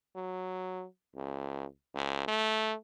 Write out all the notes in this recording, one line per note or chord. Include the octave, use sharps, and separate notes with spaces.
F#3
C#2
C#2
A3